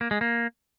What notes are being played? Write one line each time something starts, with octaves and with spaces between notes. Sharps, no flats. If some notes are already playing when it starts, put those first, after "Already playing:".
A#3
G#3
A#3